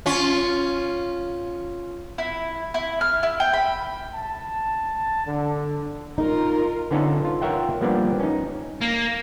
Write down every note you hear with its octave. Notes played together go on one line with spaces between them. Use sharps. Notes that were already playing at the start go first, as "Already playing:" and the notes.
C#4 F4
E4
E4
F6
E4
G5
B5
A5
D3
D#4 F4 A#4
D3 B3 C#4 D#4 F4 A4
F4
F4 A#4 C#5 E5 F#5 G5
F3 G3 A#3 B3 D4 D5
C#4 D#4
A#3